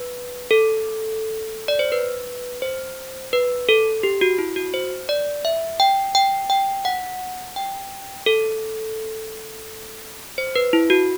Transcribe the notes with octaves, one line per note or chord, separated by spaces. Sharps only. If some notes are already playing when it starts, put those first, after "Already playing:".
Already playing: B4
A4
D5
C5
B4
C5
B4
A4
G4
F#4
E4
F#4
C5
D5
E5
G5
G5
G5
F#5
G5
A4
C5
B4
E4
F#4